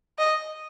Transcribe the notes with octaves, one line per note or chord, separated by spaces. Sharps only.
D#5